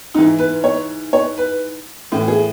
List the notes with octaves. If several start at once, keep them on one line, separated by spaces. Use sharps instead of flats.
G#2 E3 D#4
B4
C#5
C#5
B4
A2 E3
G#4